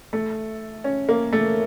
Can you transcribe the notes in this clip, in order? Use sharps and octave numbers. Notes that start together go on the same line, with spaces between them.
A3
C#4
A#3
A3